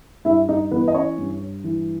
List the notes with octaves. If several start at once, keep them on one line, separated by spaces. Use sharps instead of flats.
G2 E4 E5
D#4 D#5
E3 B3 B4
D#5
C#4 C#5
G2
E3